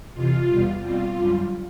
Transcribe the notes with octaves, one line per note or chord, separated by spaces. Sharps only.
F2 C3 E3 F4
E2 B2 G3
B2 G3 C4 F4
F#2 D3 G3